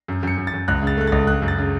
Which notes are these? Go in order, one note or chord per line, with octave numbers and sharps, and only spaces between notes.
F#2
F#2 C#7
F#2
A6
F#2
C#2 F#6
C#3 A6
A3 F#6
C#2 A6
C#3 F#6
F#2
A6
C#3